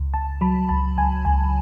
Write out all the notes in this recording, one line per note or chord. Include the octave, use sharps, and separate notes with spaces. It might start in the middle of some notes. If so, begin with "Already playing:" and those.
Already playing: C#2
C#2 A5
F#3 B5
C#2 A5
C#2 G#5
C#2 G#5